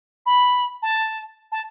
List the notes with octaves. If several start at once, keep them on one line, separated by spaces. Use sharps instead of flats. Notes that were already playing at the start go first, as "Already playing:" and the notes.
B5
A5
A5